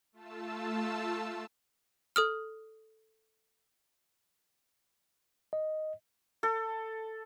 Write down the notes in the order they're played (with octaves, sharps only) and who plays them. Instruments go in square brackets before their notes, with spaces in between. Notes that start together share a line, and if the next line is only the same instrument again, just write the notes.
[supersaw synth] A3 F4 A5 E6
[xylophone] A4 D#6 F6
[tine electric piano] D#5
[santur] A4